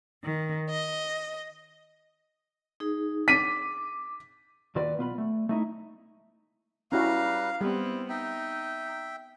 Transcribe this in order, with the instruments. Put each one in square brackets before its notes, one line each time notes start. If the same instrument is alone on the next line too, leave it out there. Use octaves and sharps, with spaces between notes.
[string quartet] D#3
D#5
[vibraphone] D#4 G#4
[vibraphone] D6 [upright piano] B6 D#7
[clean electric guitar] D#2 D#3 F4 F#4 B4 D5
B1 B3 F4 B5
A3
A3 D#4 E4
[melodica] G3 B4 A#5 [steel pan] C#4 E4 F#4 [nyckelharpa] F5
[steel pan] G3 [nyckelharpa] B3 C4 [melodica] E4
[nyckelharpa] D#4 [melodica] E5 G5